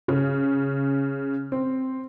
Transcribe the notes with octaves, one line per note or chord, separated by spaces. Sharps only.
C#3
C4